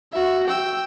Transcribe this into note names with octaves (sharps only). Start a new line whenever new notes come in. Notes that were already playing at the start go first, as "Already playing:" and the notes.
F#4 E5
G5 E6